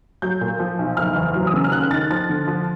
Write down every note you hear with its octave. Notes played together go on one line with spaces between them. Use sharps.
F#3 G6
A#2
F3
B1
F#1 F6
E2
F#3
D#6
C#3 E6
F6
D#2 F#6
D#3 A6
F3 A6
D3
F3